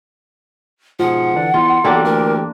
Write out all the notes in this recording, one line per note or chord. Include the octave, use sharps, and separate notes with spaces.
G#2 B2 F3 G#4 F#5
D3 E3 D4
E2 F4 C6
B1 E3 A#3 D4 G4 A4
D2 A#4